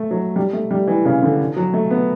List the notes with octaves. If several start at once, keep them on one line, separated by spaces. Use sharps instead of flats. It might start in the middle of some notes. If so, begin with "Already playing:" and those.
Already playing: A3
F#3
G3
A3
G3
E3
C#3
D3
F#3
A3
B3